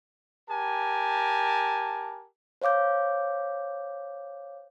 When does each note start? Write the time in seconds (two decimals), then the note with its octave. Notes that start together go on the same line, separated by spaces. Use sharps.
0.49 G4 A#4 G#5 A5
2.62 C5 C#5 F5 D6 G6